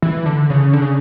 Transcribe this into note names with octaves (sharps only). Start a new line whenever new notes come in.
E3
D3
C#3
D3
C#3